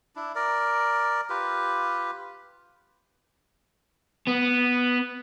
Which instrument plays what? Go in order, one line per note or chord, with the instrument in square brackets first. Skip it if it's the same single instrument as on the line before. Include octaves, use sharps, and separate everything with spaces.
[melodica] D4 E4
A#4 D5
F4 G4 B4
[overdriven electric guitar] B3